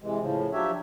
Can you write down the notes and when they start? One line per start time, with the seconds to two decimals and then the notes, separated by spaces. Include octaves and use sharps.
0.02 C3 E3 G#3
0.20 A2 C#3 F3
0.53 F3 F#3 D4 G4 C#5 E5